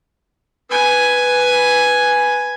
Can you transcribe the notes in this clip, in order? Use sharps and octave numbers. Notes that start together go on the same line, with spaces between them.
B4 G#5